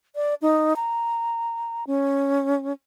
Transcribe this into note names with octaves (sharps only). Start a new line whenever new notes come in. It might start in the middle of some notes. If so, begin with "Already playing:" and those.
D5
D#4
A#5
C#4